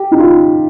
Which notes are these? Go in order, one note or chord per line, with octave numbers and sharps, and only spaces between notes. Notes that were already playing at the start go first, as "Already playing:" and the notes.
Already playing: G4
D#4
F4